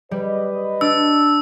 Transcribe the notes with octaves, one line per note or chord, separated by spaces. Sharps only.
G3 B4 D#5
D4 E6